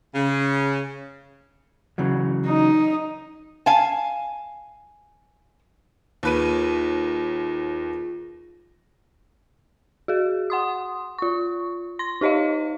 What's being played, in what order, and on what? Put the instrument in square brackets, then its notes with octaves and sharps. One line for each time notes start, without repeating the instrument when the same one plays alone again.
[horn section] C#3
[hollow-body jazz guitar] C#3 E3 F#3
[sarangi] D#4
[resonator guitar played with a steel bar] F5 G#5 A5
[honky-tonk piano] D#2 B4 D#7 [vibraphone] F4 G#4
[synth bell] F#4 G#4
F#5 C6 D#6
F4 C#6
C6 A#6
D#4 G4 C#5 D#5 F5